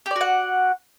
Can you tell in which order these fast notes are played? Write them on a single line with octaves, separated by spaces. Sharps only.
G4 D5 F#4 F#5